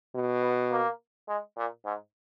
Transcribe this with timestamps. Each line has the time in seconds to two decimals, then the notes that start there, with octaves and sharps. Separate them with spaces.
0.15 B2
0.44 B3
0.72 A#3
1.29 G#3
1.57 A#2
1.85 G#2